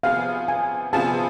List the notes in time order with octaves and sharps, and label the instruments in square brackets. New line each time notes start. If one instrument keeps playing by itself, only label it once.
[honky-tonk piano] C3 F3 B3 F4 G#4 [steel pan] F5
[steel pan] G#5
[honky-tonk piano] C3 F3 B3 F4 G#4 [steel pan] A5